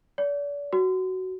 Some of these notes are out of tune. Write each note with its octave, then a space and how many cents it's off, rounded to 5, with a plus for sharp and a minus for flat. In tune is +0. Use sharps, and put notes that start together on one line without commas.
D5 -40
F#4 +10